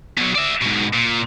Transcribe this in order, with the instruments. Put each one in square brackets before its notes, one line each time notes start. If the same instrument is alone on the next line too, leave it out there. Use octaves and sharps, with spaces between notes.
[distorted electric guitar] B2 F#3
D5 E5
G#2 B2
A#2